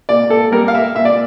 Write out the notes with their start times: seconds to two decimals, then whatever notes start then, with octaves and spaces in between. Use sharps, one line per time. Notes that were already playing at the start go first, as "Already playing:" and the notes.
0.09 A#2 D5
0.30 A4
0.52 G3 A#3 A#4
0.68 F5
0.75 E5
0.95 A#2 E5
1.05 D5